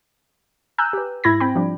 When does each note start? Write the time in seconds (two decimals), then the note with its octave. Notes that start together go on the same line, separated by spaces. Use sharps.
0.78 G#5 A#5 E6 F#6 G6
0.93 G4 B4
1.24 G#2 E4 B5 G#6 A#6
1.40 C4 G5 B5
1.55 F3 G3 D4